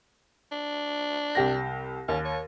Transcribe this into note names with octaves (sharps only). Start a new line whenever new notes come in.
D4
C2 G4 A#6
D#2 C#4
C#5